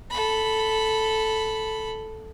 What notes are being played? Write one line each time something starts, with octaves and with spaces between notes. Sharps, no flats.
A4 B5